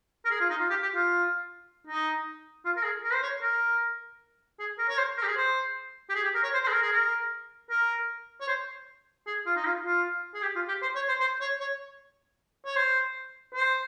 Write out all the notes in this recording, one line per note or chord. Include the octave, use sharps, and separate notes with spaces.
A#4
G#4
F4
D#4
F4
G4
G4
F4
D#4
F4
A#4
G#4
A#4
C5
C#5
A#4
G#4
A#4
C#5
C5
A#4
G4
G#4
C5
G4
G#4
G4
A#4
C#5
C5
C5
G#4
A#4
G#4
A#4
A#4
C#5
C5
G#4
F4
D#4
F4
F4
G#4
G4
F4
G4
C5
C#5
C5
C5
C#5
C#5
C#5
C5
C5